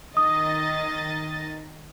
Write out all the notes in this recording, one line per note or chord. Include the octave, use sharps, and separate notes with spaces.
D#3 D#5 D#6 A6